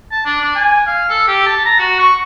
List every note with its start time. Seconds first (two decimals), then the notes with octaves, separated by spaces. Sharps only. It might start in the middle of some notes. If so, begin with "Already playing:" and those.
0.12 A5
0.26 D4
0.41 D4
0.55 G#5
0.87 F5
1.10 A4
1.28 G4
1.47 A5
1.65 A#5
1.79 F#4
1.99 C#6